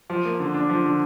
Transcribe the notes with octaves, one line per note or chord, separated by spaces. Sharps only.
F3
A#3
D3
D4
F3
D3